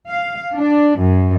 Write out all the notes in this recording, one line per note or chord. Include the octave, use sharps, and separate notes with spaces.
F5
D4
F#2